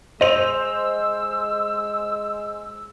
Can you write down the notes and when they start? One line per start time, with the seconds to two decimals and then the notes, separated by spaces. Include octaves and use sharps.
0.21 G#3 C5 D#5 E6 F7